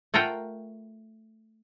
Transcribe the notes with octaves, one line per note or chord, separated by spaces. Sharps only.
A3 F4 A#4 F#5 G5